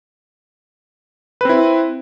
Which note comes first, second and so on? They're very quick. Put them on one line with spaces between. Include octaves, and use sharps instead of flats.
B4 C4 E4